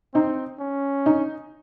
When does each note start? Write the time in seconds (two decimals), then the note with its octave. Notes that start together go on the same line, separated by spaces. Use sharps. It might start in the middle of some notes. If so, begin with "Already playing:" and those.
0.14 C4 D#4
0.60 C#4
1.06 D#4